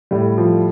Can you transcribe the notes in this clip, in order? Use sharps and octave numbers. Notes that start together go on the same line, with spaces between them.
A2 G3
F3